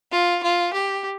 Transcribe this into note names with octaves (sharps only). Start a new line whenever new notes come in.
F4
F4
G4